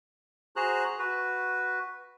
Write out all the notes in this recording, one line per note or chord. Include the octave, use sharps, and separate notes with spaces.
F#4 G#4 C5 A#5 F#6
F#4 B4